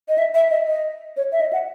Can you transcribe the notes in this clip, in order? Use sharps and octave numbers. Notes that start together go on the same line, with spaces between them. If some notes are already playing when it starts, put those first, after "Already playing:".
D#5
E5
E5
D#5
D#5
C#5
E5
D#5
F#5